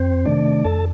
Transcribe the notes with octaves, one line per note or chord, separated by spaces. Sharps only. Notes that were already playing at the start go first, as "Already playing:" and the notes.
Already playing: F2 C4 C5
C3 D#3 A3 D4 D5
F2 A4 A5